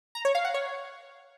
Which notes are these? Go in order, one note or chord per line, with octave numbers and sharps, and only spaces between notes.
A#5
C#5
F5
F#5
C#5